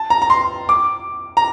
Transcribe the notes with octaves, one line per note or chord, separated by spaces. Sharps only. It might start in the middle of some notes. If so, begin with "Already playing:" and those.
Already playing: A5
A#5
A#5
C6
D6
A#5